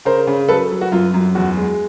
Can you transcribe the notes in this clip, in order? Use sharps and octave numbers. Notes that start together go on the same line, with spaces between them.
C#3 A#4 C5
C#3
F#3 A4 B4
F#3
F#4
F#2 F4
F#2
E2 F#4
G#3